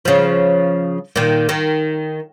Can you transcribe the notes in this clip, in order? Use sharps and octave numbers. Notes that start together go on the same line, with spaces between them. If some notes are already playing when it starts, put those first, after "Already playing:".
C#3 F3
A#2 D#3
D#3